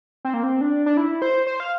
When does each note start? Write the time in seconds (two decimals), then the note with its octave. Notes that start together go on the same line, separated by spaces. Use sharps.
0.25 C4
0.34 A#3
0.43 C4
0.61 D4
0.86 D4
0.97 E4
1.22 C5
1.46 C5
1.60 F5